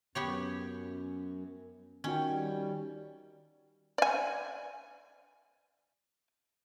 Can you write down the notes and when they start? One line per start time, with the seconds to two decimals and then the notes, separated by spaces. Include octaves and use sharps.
0.15 F#2 B3 G4 C#5
2.04 D#3 C#4 F#4 G5
2.27 G3
3.98 D5 G#5